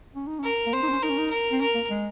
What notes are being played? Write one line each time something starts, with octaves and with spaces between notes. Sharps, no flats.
C#4
D#4
C#4 A#4
A#3
C4 C5
D#4
C4
C#4
D#4 A#4
C#4
D#4
A#4
C4
C#4 A#4
A#3
G#3